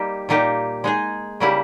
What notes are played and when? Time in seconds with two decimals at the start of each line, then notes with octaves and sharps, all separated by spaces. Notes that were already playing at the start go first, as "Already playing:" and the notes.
Already playing: G3 A#3 D#4 G4
0.29 A#2 A#3 D#4 G4
0.84 G#3 D#4 G#4
1.40 C#3 G3 A#3 E4 G4